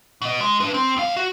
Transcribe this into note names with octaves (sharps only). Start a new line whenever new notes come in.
B2 D#5
G#3
D4 B4
C4
D#2 F5
F#4